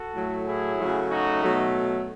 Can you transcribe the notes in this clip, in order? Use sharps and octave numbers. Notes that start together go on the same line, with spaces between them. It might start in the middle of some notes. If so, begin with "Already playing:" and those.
Already playing: F#4 A4
A2 F#3 A3
E4 G#4
C#3 F#3 A3
D#4 F#4
B2 F#3 A3